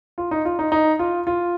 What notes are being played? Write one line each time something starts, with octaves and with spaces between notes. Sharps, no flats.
F4
D#4
F4
D#4
D#4
F4
F4